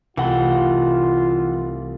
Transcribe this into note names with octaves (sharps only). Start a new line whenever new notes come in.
C2 E3 A3 F4 F#5 C6